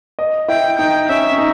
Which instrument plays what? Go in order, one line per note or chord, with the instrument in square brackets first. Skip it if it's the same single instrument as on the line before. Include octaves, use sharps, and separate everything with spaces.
[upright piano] D#5
[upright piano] E4 [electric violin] G5
[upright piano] D#4 [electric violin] G5
[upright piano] C#4 [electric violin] E5
[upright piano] C#4
D#4